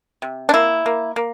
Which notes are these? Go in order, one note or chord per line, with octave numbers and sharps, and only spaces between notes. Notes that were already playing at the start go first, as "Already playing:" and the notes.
C3
D4
A#3 E4
A#3
A#3